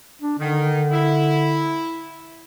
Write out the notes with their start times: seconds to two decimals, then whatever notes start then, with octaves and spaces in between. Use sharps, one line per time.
0.22 D4
0.39 D3 D#3
0.91 E4